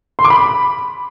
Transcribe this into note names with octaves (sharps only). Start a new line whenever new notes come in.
C6
D6
B5